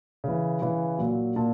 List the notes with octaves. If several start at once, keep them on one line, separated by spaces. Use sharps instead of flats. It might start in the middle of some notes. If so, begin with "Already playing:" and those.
C#3 E3
C#3 E3
A#2 F#3
A#2 A5